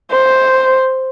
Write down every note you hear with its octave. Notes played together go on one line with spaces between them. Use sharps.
C5